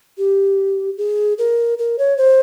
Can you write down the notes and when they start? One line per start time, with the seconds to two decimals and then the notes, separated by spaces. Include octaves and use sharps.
0.18 G4
0.97 G#4
1.38 A#4
1.78 A#4
1.98 C#5
2.17 C5